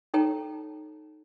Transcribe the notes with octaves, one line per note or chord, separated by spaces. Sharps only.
D#4 A4 C#5 G5 A5 A#5